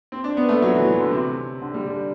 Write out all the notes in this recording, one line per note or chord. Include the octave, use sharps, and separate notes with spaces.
C4
D4
B3
A3
F#3
E3
F#3
D3
C3
D3
G3
D4